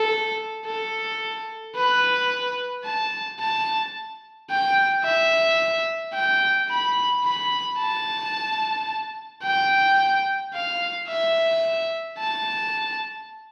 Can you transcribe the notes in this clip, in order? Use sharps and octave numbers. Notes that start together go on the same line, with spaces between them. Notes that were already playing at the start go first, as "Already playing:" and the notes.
Already playing: A4
A4
B4
A5
A5
G5
E5
G5
B5
B5
A5
G5
F5
E5
A5